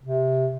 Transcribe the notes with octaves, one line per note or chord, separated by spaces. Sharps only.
C3